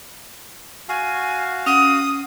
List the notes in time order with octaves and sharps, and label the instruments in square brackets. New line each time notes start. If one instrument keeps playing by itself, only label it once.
[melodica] F#4 F5 [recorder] G#5
[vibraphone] C#4 F#5 [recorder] D#6